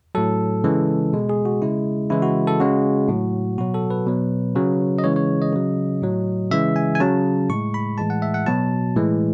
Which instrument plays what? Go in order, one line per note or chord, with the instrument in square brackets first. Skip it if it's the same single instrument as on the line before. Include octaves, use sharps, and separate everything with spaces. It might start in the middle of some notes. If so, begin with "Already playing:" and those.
[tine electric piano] A2 F#3 A4
C#3 E3 G#3
B2 G#3
G#4
F#4
C#3 G#3 E4
C#3 E3 G#3 E4
F#4
A4
C#3 G#3 F#4
A2 F#3
B2 F#3 F#4
A4
B4
B2 F#3
C#3 F#3
D#5
C#3 E3 G#3 C#5
C#5
D#5
C#3 F#3
A2 F#3
C#3 E3 G#3 E5
G#5
G#5
C#3 F#3 A5
A2 G#3 C#6
B5
A2 E3 G#3 A5
F#5
E5
F#5
B2 F#3 A5
A2 E3 G#3